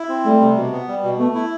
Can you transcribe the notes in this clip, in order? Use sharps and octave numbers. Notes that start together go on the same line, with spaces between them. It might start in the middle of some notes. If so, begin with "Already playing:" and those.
Already playing: E4
C4
G3 A3
C3
B2
B3
G3
B2
A3 B3
E4